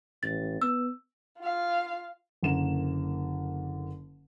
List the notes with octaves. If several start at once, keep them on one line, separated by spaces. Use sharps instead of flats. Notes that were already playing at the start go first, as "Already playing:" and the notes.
A1 A6
B3 E6
F4 F5
F#1 D3 A#3 E7